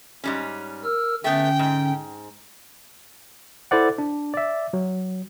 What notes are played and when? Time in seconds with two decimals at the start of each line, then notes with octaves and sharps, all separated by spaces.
0.24 G#2 G3 C#4
0.84 A#4 E6 F6
1.24 D3 A3 B3 C#4 G5
1.59 G#2
3.71 E4 A4 C5 D5 F#5
3.98 D4
4.34 D5 E5
4.73 F#3